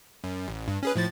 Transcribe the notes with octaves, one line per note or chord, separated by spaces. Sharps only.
F#2
A1
G2
C#4 G#4 B4
A2 F3 A6